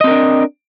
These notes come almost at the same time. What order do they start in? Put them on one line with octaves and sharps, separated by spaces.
D#5 C4 A#4 D4